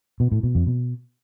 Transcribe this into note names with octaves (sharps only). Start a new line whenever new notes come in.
B2
A2
B2
F2
B2